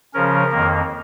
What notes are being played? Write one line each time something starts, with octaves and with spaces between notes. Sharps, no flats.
C#3 F3 C#4 A#4
F2 D#3 A#3